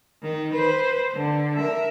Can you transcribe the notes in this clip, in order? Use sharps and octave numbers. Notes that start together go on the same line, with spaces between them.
D#3
B4 C5
D3
A#4 E5